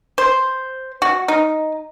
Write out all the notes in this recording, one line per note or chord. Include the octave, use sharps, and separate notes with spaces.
C5
F#4
D#4